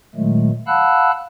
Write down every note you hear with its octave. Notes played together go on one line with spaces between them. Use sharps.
A#2 D#3 F#3 G#3 A3
F5 F#5 A5 B5 E6 F#6